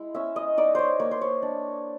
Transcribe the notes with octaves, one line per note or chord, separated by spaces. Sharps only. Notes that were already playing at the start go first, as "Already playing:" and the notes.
Already playing: G#3 E4
C#4 E5
D#5
D#4 D5
C5 C#5
A#3 C#5
C5
C#5
D4